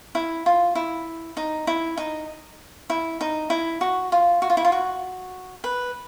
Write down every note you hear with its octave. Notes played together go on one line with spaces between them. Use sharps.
E4
F4
E4
D#4
E4
D#4
E4
D#4
E4
F#4
F4
F#4
F4
E4
F4
F#4
B4